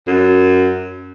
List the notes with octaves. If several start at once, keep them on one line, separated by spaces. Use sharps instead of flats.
F#2